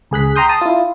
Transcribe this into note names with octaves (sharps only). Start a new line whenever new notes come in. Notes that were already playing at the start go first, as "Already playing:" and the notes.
C#2 G#4 F#6 B6
G5 A#5 C6 D#6 G6
A5 D#6
E4 F4